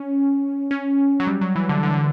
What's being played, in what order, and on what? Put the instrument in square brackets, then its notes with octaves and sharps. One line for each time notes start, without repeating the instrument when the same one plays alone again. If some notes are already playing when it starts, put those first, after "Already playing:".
Already playing: [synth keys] C#4
C#4
F#3
G3
F#3
E3
D3
D3
D3